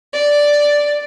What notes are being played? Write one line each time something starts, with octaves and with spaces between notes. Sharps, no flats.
D5